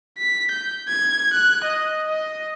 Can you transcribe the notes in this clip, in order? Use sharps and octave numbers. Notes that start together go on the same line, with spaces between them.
B6
G6
G#6
F#6
D#5
D#5